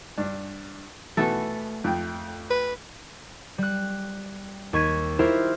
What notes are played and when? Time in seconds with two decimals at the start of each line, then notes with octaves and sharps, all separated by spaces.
0.18 G2 D4
1.17 B2 E3 A3 B3 A4
1.84 F2 G5
2.51 B4
3.58 G3 F#6
4.73 D#2 C#6 G#6 B6 D#7
5.19 E4 F4 G4 A#4 C5 E5